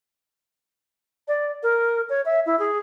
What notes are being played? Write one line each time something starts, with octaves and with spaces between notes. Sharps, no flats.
D5
A#4
C#5
E5
E4
G#4